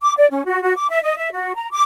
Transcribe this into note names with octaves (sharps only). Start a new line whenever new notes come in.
D6
D5
C#4
F#4
F#4
D6
E5
D#5
E5
F#4
A#5
D6